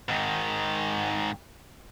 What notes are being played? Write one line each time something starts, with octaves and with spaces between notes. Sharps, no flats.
G#2 D#3